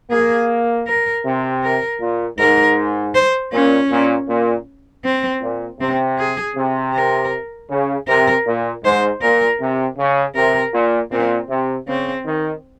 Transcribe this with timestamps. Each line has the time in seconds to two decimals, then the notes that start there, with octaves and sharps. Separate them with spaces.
0.11 A#3 G#4
0.87 A#4
1.25 C3
1.63 A#4
2.00 A#2
2.38 G#2 A#4
3.14 C5
3.52 A#2 C#4
3.90 A#2
4.28 A#2
5.05 C4
5.42 A#2
5.80 C3 C4
6.19 G#4
6.56 C3
6.94 A#4
7.70 C#3
8.08 C3 A#4
8.47 A#2
8.84 G#2 C5
9.22 A#2 A#4
9.61 C3
9.98 C#3
10.36 C3 A#4
10.74 A#2
11.12 A#2 C4
11.50 C3
11.88 C#3 C4
12.25 D#3